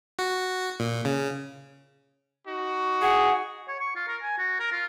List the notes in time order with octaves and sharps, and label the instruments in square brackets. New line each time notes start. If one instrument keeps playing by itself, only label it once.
[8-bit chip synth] F#4
A#2
C#3
[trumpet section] D#4 F#4
[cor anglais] G#4 [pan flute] F#5
[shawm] C#5
C#6
F4
A#4
G#5
F#4
A#4
F4